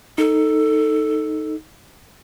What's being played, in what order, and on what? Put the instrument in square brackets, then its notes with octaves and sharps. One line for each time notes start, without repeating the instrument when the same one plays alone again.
[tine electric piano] D#4 [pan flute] A4